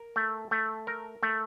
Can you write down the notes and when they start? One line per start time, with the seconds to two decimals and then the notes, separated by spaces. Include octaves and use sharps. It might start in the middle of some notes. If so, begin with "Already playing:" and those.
Already playing: A#4
0.16 A3
0.51 A3
0.87 A#4
1.23 A3